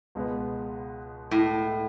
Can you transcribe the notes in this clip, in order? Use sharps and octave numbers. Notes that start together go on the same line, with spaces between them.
C#2 B2 G#3 B3
A2